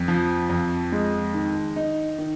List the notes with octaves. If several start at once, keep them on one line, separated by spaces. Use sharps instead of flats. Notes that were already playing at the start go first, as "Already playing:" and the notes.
Already playing: F2
F3
F2
G#3
D#3
D#4
D#3